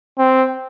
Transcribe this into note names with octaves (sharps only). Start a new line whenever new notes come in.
C4